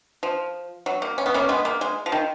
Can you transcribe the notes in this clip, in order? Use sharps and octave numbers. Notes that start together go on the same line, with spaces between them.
F3
F#3
A#3
C#4
B3
A#3 C#4
G#3 B3
A#3
G#3
F3
D#3